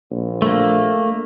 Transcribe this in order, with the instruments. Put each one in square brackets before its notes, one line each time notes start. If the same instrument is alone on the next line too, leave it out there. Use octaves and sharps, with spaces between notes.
[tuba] A#1
[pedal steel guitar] A3 A#3